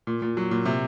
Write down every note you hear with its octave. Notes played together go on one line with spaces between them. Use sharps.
A#2
A#2
F#3
A#2
C3